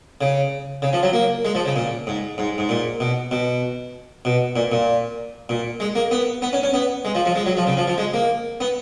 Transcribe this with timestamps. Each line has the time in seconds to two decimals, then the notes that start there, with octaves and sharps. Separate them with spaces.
0.21 C#3
0.82 C#3
0.93 F3
1.03 F#3
1.13 A#3
1.45 G#3
1.55 F3
1.66 C#3
1.76 A#2
2.07 G#2
2.38 G#2
2.58 G#2
2.69 A#2
3.00 B2
3.31 B2
4.25 B2
4.56 A#2
4.72 A#2
5.49 A#2
5.80 G#3
5.95 A#3
6.11 B3
6.42 B3
6.53 C#4
6.63 C#4
6.74 B3
7.05 G#3
7.15 F3
7.25 F3
7.36 G#3
7.46 F#3
7.57 F3
7.67 C#3
7.77 F3
7.88 F3
7.98 G#3
8.14 A#3
8.60 B3